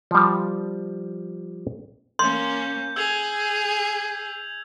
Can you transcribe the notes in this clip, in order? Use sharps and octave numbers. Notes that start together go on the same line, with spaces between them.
F3 G3
A#3 C#4 C6 G6
G#4 E6 G#6 F7